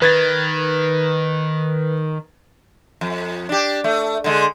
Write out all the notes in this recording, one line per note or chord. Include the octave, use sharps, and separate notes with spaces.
D#3 B4 G#6 A6
F2
D4 G4
A3
D3 G#3